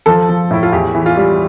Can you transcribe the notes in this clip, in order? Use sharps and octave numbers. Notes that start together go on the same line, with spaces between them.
F3 A4
F3
A2 E4
F4
E2 G4
E3
F4
G3